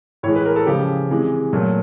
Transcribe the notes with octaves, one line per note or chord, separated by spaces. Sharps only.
A2 E3 G#3 C#5
B4
A#4
A4
C#3 F3 G#3 G4
C3 E3 G#3
A#2 F#3 A3